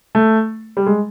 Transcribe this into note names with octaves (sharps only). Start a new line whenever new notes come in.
A3
G3
G#3